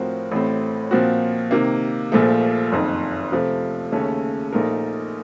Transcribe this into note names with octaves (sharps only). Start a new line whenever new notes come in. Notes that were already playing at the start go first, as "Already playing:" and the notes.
Already playing: A2 F3 C4 F#4 A#4
A1 A2 A3 C4
A#2 F3 C4 F#4
C3 D#3 A#3
A#1 A#2 F3 A3
F#1 F2 D#3
C3 F3 A3
D#2 C#3 A3 C#4 A4
A#1 A#2 A3 D#4 A#4